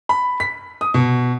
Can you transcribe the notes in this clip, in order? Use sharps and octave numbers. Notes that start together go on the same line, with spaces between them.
B5
B6
D#6
B2